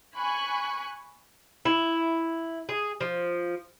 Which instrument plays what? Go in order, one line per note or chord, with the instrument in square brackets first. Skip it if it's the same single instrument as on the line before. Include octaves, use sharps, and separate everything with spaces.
[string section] G#5 B5 C#6 F#6
[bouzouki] E4
G#4
F3